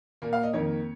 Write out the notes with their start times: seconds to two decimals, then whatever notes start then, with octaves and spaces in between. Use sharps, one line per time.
0.22 A#2 A#3
0.33 F5
0.43 D#5
0.53 F2 D#3 A#3 C#5